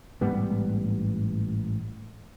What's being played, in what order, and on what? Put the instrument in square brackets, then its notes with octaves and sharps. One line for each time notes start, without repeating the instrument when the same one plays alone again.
[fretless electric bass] A1 G#2 G3 B3